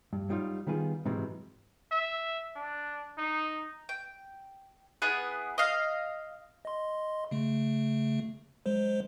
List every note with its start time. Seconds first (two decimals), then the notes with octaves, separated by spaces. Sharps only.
0.13 G2
0.29 F#3 G3 D#4 F4 C#5
0.67 D#3 G3 B3 F4 G#4
1.05 G#2 C3 E3 F#3 G#3
1.92 E5
2.55 D4
3.18 D#4
3.89 G5
5.02 B3 E4 G#4 F#5
5.58 D#5 F5
6.65 D#5 C6
7.31 C#3 A3
8.66 F#3 G#3 C5